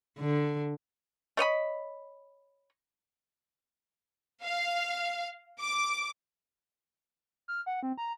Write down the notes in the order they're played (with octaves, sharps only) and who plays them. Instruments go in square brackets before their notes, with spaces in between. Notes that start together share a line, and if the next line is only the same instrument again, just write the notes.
[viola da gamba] D3
[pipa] A3 C#5 D#5 B5
[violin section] F5
D6
[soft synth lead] F6
F#5
C4
A#5